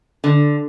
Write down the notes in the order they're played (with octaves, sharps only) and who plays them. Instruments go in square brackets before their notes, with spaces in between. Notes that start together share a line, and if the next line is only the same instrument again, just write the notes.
[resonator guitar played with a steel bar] D3